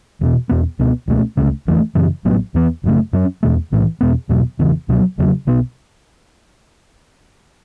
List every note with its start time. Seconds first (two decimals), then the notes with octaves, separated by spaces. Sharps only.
0.21 E1 E2 B2
0.49 E2 B2 B3
0.79 C#2 B2 B3
1.08 C#2 B2 A3 C#4
1.37 C#2 C#3 A3 C#4
1.67 F#1 E2 E3 A3
1.95 F#2 C#3 E3
2.25 A1 A2 F#3 B3
2.54 E2 E3 B3
2.84 F#1 F#2 C#3 A3
3.13 F#2 F#3 C#4
3.43 E2 B2 A3
3.72 B1 A2 E3
4.01 E2 B2 B3
4.29 E2 B2 F#3
4.59 E1 E2 C#3 E3
4.89 C#2 B2 F#3
5.18 F#1 E2 C#3 F#3
5.47 B1 B2 B3